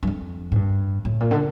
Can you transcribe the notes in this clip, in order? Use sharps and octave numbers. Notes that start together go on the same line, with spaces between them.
G2
F2
A2
G2
A2
A#2
D3